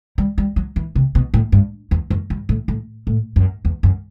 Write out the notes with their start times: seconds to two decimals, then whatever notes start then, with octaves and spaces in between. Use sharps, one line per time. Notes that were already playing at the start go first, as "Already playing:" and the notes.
0.18 G3
0.38 G3
0.56 F#3
0.76 E3
0.95 C3
1.15 B2
1.34 A2
1.52 G2
1.91 E2
2.10 F#2
2.30 G2
2.49 A2
2.68 A2
3.07 A2
3.36 F#2
3.65 E2
3.83 F#2